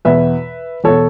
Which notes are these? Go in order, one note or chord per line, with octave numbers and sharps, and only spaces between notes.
E2 B2 B4 E5
E2 B2 A4 C#5